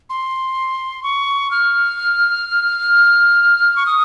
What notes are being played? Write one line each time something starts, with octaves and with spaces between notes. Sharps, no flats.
C6
C#6
F6
C#6
D#6